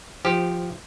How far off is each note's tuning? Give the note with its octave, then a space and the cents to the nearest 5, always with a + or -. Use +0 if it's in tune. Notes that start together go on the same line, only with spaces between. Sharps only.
F3 +0 G4 +0 C5 -15